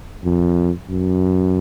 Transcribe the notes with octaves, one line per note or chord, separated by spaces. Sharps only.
F2
F#2